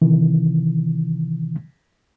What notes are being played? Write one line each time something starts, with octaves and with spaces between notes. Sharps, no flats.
C3 D#3 E3